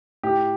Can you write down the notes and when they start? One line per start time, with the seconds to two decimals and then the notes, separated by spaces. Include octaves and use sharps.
0.23 A2 G4